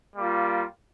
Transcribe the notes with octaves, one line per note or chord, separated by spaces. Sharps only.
G3 A#3 F4